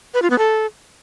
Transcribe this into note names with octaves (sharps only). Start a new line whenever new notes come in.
B4
F4
B3
A4